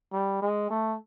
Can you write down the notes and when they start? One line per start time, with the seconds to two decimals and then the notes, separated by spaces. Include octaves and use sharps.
0.13 G3
0.42 G#3
0.70 A3